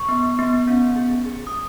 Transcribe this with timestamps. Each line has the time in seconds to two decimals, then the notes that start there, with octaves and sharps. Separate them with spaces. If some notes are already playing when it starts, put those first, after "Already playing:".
Already playing: C#6
0.08 B3
0.39 B3
0.68 C#4
0.96 G#4
1.26 G#4
1.47 D#6